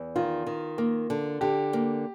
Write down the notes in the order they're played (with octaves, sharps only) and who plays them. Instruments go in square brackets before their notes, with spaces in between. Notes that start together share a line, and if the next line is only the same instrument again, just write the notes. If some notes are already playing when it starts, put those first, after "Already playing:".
Already playing: [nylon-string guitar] E2
[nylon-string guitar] D#3 [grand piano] F4
[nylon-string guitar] D#3
A#3
D3
[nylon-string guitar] D3 [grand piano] G4
[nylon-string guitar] A#3